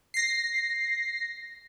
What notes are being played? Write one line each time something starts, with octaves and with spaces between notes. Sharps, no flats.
A#6 C7